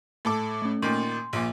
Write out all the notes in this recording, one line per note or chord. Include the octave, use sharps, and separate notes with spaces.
A2 A4 D6
A3 C#4
A#2 D#3 C6
A#1 A#2